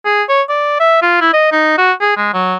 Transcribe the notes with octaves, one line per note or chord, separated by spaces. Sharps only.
G#4
C#5
D5
E5
F4
E4
D#5
D#4
F#4
G#4
G#3
F#3